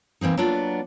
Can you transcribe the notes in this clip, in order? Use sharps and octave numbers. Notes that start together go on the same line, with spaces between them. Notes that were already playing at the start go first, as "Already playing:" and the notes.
E3 A#3 C4 D#4
F#3 A#3 B3 D4 F4